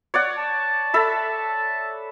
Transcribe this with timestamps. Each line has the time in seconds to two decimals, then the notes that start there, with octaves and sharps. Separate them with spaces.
0.14 C#5 D5 F#5
0.37 A5
0.94 A4 E5 B5